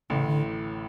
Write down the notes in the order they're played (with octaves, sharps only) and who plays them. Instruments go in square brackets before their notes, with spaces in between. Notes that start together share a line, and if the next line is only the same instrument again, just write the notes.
[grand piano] A1 A2 [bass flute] C#3
[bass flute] D3